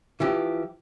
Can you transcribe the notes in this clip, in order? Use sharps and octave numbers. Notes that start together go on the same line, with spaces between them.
E3 F3 G4